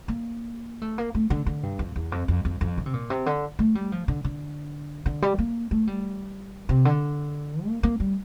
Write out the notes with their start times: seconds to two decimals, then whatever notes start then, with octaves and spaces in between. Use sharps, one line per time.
0.08 A#3
0.82 A3
0.98 A#3
1.15 A3
1.30 D3
1.46 D3
1.63 G2
1.79 F2
1.96 E2
2.12 F2
2.28 F2
2.45 F2
2.61 F2
2.78 D3
2.86 C3
2.94 A#2
3.10 C3
3.26 D3
3.59 A3
3.75 G3
3.92 F3
4.08 D3
4.24 D3
5.06 D3
5.22 G3
5.38 A#3
5.71 A3
5.87 G3
6.69 C3
6.85 D3
7.67 A#3
7.83 A#3
8.00 G3